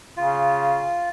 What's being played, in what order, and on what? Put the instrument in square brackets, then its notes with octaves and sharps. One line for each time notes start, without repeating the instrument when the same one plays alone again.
[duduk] C#3 [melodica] F4